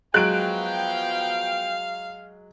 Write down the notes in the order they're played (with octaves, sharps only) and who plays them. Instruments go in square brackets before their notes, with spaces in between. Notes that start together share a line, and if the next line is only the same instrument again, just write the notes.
[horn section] F3 B3 G5 [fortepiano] F#3 G#3 [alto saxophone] F5 [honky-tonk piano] F#6 D7